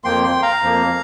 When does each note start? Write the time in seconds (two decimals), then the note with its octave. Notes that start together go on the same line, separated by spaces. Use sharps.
0.04 F2 F3 A#3 G5 C6
0.24 G5 C6
0.42 F5 A#5
0.62 F2 F3 A#3